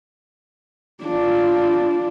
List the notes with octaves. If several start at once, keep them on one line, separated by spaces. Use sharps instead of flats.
D4 F4